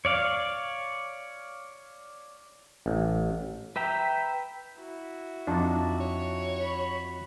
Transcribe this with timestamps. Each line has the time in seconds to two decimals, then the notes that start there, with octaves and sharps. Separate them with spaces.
0.05 C#5 D5 F5
2.86 A1
3.76 B4 E5 G5 A#5
4.75 E4 F#4
5.47 F2 D4 D#4
6.00 C#5
6.57 F#4 B5